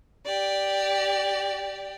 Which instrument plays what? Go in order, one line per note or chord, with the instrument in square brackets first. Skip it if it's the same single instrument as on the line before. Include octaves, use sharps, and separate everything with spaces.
[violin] G4 D5